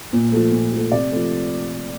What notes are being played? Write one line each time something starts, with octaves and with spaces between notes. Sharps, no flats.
A#2
F3 A3
A#2
F3 A3
C3 D5
F3 A3